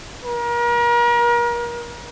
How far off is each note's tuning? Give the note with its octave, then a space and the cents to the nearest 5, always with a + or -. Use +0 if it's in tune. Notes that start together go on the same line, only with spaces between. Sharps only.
A#4 +35